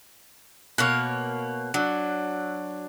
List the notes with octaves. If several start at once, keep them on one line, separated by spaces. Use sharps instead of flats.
B2 A#3 C#5 F6 F#6
F#3 D4